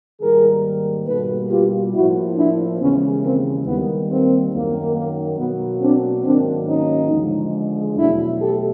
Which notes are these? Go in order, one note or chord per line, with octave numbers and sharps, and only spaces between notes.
G#2 D#3 G3 A#3 G#4 A#4
B2 G3 A#3 A4 B4
F4 G4
A2 F3 A#3 E4 F#4
D4 E4
D#2 C#3 E3 G#3 B3 C#4
A#3 C4
D#2 D#3 G3 A#3 B3
A#3 C4
F#2 D#3 F#3 A#3
A#3
B2 F#3 A#3 B3
C4 D4
G#2 D#3 F#3 A#3 C4 D4
C#4 D#4
D#2 D3 F3 G#3
E2 B2 F#3 A3 D4 E4
G4 A4